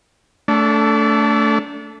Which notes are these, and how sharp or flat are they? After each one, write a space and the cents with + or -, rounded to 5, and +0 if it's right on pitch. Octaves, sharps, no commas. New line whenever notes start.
A3 +5 D4 -30 A4 +0